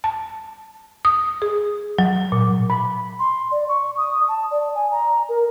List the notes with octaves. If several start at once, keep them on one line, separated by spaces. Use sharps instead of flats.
A5
D#6
G#4
F#3
A#2
B5
C6
D5
C#6
D#6
A5
D5
G#5
A#5
A#4